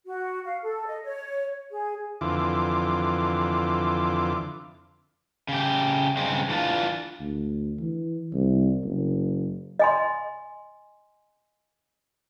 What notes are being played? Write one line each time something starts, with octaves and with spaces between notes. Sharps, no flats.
F#4
F5
A4
D#5
C#5
G#4
F2 D3 E3 F4 D6
C#3 G4
G2 C#3 G#3 C4 C#4
E3 D4 F4
D2
E3
C2
F#1
D#5 G#5 C6